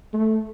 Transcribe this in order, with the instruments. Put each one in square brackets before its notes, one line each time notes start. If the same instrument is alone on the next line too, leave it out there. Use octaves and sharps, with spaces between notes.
[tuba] A3